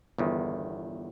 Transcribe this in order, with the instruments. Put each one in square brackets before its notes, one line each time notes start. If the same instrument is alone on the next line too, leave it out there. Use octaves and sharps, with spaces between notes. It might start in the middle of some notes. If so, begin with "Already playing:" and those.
[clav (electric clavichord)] G1 E2 D#3